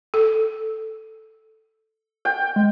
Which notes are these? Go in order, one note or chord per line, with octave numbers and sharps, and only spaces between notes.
A4
G5
G#3